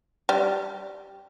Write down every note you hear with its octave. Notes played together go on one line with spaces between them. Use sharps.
G3